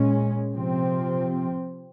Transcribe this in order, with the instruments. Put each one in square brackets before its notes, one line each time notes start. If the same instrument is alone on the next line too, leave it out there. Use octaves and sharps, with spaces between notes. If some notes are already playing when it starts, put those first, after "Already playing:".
Already playing: [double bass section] A#2 G#3 C#4
C3 F3 C4